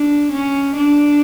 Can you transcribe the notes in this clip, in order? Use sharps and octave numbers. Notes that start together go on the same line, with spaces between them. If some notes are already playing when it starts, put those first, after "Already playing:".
Already playing: D4
C#4
D4